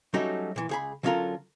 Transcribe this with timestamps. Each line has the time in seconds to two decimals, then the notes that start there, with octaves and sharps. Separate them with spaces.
0.14 F#3 G3 A3 C#4 D#4 F#4
0.56 A#2 E3
0.69 C#2 G#4 B5
1.03 D3 F#3 C#4 F4 A4 A#4